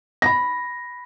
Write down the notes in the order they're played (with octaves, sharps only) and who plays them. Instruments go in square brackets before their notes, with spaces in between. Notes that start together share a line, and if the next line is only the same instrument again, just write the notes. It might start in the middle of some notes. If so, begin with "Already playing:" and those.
[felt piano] B5 A#6